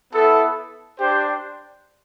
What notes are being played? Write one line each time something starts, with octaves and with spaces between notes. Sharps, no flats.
B3 E4 A4
D4 G4 C5